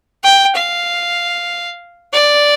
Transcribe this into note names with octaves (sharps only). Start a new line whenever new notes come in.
G5
F5
D5